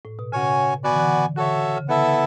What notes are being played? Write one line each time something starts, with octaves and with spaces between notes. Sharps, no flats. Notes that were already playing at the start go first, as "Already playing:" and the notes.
A2
B2
C#3 C#4 F#4 C#5 G#5
D3 B3 F#4 B4 D5 G#5
E3
D3
D3 F#4 A4 C#5 E5
C#3
D3 B3 E4 A4 E5